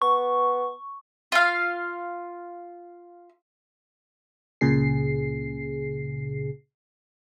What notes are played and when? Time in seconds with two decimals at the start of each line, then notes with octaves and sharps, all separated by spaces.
0.02 B3 C#6
1.32 F4 F5
4.61 C#2 A#2 C#3 G#4 C7